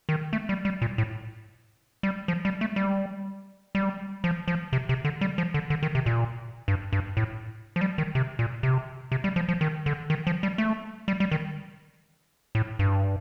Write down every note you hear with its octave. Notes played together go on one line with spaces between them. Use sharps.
D#3
A3
G3
G3
A#2
A2
G3
F3
G3
A3
G3
G3
F3
F3
C3
C3
D3
G3
F3
D3
D3
D#3
C3
A#2
G2
G2
A2
F3
G3
D#3
C3
A#2
C3
C3
G3
F3
F3
D#3
D3
D#3
F3
G3
A3
G3
G3
D#3
A2
G2